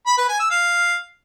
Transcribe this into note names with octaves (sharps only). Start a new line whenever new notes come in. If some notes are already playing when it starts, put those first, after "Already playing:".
B5
B4
G#5
E6
F5